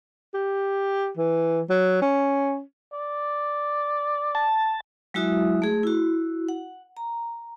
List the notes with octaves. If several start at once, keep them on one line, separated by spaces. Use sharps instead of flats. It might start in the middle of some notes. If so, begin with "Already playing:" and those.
G4
E3
F#3
C#4
D5
A5
F#3 G#3 E4 F#4 E5 D#6
A3 G#4
E4 F#4
F#5
A#5